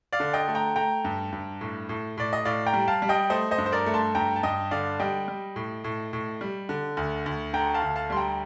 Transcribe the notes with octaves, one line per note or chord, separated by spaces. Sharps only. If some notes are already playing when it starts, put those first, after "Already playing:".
D5 F5
D3
D#5 G5
A3
G5 A#5
A3 G5 A#5
G2
G2
A2
A2
A2 D5
D#5
A2 D5 F5
G5 A#5
G3
F5 A5
G3
D#5 G5
A3 C5 D#5
C5 D#5
G2
C5
A#4 D5
A3
A5 C6
G2 G5 A#5
A5
G2 D#5 G5
D3 D5 F5
G3 D#5 G5
G3
A2
A2
A2
G3
D3
D2
D2
D3 G5 A#5
F5 A5
D2
F5 A5
G3 C6
G5 A#5